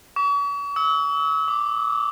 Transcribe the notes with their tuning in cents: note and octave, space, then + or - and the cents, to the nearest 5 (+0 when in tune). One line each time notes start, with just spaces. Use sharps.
C#6 +45
E6 -40
D6 +0